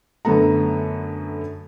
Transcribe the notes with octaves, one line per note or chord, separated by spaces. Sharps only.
F#2 D3 A3 B3 A4 A#5